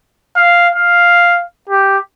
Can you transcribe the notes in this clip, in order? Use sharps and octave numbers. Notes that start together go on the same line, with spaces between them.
F5
F5
G4